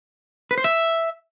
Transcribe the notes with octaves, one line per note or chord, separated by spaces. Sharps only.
B4
C5
E5